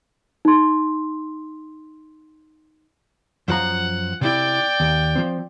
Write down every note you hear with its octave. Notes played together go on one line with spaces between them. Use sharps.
D#4 C6
F#2 F3 F#5 A#5
C3 E4 D5 G5
D#2
F3 C4